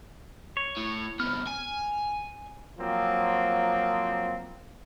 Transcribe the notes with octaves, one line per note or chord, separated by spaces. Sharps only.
C#5
A2
C2 B3 F6
G#5
F3 F#3 A#3 C4